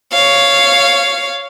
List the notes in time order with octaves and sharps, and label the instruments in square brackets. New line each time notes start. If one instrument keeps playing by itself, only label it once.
[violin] C#5 F5